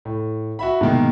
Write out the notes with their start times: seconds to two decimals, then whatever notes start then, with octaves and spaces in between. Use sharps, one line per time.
0.05 A2
0.59 F#4 E5 B5
0.81 G#2 B2 D#3 A#3